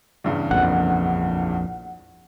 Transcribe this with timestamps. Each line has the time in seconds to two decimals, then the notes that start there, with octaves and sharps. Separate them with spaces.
0.24 E2 G2 C#3
0.51 A#1 F2 F#5